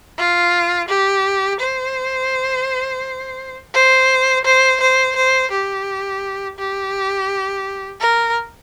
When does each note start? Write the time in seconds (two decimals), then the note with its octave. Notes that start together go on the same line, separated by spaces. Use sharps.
0.18 F4
0.88 G4
1.60 C5
3.74 C5
4.44 C5
4.80 C5
5.16 C5
5.51 G4
6.59 G4
8.01 A#4